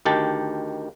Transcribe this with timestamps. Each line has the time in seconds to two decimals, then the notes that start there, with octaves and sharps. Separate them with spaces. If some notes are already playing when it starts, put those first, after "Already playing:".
0.05 D2 D#3 G4 A5